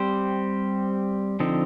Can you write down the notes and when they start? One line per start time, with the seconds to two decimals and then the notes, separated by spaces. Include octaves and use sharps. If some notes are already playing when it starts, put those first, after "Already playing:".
Already playing: G3 C4 G4 C5
1.40 D3 F3 C4 D#4